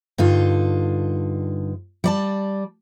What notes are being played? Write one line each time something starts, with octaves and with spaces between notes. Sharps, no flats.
G2 D3 D#4 F4
G3 D5 A5